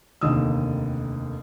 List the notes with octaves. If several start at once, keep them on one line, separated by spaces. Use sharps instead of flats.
F1 D#2 D3 D#3 D#6 E6